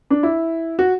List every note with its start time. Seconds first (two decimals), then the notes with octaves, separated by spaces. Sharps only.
0.10 D4
0.23 E4
0.79 F#4